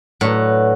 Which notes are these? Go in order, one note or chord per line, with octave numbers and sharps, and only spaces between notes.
A2 F#3 D4 F#4 B4